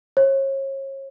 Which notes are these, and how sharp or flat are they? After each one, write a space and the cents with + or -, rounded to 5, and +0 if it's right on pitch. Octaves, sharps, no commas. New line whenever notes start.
C#5 -35